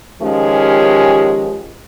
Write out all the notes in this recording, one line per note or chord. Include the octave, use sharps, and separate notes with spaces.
D#3 F3 G#3 C#4 G4